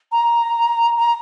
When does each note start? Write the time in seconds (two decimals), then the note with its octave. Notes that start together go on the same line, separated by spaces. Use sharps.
0.12 A#5
0.98 A#5